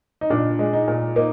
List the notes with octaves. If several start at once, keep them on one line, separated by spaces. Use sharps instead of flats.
D#4
A#2 D4
G#3
D#4
A#2
A#3 D#4